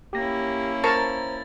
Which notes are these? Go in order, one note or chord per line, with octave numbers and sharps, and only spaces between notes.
A#3 C#4 E4 G4 A#6
A#4 C5 A5 A#5 C#6 A6